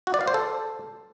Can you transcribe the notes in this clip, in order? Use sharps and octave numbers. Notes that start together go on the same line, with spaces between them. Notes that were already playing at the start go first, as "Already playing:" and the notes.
F#4
D5
F5
C5
A4